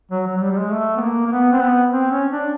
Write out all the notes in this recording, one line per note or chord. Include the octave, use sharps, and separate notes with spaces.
F#3
F#3
F#3
G3
G3
G#3
A3
B3
A#3
A#3
B3
C4
B3
C4
C#4
D4